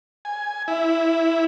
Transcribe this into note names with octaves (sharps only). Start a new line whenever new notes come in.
G#5
E4